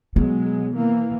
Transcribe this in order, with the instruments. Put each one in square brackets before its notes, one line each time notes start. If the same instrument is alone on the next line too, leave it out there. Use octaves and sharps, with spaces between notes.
[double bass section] B2 F#3 G#3 [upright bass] B3
[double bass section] E3 A#3